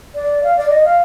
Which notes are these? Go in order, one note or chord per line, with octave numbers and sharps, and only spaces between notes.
D5
F5
D5
D#5
F5